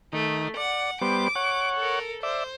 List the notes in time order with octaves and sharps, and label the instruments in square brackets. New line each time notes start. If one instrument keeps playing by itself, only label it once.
[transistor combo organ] D#3 [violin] A3
[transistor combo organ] D5 [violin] F#5
[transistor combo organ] G3 B3 C5 [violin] D6
[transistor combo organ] C#5 F#5
[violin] A4 A#4
[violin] C5 [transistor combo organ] D5 E5